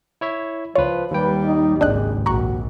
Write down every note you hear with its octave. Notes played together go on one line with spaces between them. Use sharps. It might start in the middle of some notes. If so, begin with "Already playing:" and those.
E4 C#5 E5
C#2 F3 F4 B4 C#5
D#2 G3 B4 G5
D#4
G#1 C#2 G#3 D4 D#5 F#6
A#1 F#4 A#5 C#6 F#6